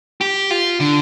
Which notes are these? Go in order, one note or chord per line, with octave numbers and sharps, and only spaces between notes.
G4
F4
D3